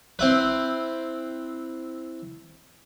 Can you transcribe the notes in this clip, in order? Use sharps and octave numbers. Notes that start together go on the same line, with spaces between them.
C4 E4 B4